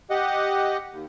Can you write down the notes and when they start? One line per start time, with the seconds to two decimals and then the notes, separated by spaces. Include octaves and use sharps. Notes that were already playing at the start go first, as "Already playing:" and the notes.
0.10 G4 D#5 F#5
0.92 D#2